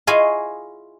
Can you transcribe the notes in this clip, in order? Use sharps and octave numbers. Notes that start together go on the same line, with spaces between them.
E4 F4 G#4 C#5 D#5 F5